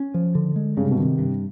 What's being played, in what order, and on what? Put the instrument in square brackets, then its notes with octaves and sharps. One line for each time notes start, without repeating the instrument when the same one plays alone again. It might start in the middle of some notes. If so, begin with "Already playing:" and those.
Already playing: [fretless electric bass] C#4
F3
D3
G#3
[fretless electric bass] G2 [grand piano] C#3
[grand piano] C3
B2
[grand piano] C3 [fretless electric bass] D#3
[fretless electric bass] G2